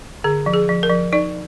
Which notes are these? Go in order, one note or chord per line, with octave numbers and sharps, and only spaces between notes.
D3 G#4
F3
G#4
F3
A#4
F3
D#4 D5